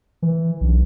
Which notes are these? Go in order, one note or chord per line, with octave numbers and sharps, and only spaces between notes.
E3
B1